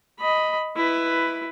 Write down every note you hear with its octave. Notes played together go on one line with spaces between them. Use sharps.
D#5 B5
E4 B4